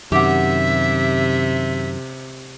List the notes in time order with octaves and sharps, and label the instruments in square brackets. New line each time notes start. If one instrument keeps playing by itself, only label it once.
[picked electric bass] F#2 D#3 [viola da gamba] C3 [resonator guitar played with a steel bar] G4 F#5 [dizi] E5